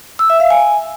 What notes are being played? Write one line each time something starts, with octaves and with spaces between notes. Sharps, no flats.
E6
E5
F5
G#5